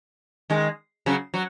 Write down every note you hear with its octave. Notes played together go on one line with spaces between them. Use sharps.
D#3 G#3
C#3 F#3
F#3